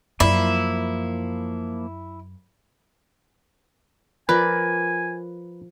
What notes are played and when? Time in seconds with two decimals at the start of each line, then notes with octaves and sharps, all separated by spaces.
0.20 F#2 F3 A#3 E4
4.29 F3 A#4 B4 D5 G#5